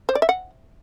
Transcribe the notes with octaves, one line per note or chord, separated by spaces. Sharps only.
C5
D5
E5
F#5